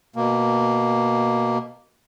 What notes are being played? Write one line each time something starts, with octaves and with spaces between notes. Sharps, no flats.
B2 A#3